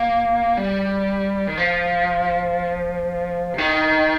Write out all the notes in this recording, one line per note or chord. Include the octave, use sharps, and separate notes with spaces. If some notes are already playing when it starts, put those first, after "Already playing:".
Already playing: A#3
G3
D#3
F3
C3
D#3